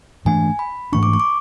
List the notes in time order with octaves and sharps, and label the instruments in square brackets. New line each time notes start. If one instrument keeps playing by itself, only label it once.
[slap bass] G#2 E3 A3 D4 [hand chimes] G#5
[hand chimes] B5
[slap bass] G#2 E3 A3 D4 [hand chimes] C#6
[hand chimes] D6
C#6
D6